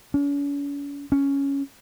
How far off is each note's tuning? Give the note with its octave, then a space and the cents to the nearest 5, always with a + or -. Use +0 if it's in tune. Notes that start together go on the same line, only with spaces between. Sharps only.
C#4 +45
C#4 +5